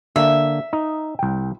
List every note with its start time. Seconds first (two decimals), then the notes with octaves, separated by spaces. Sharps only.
0.16 D3 A#3 E5
0.73 D#4
1.19 C2 G5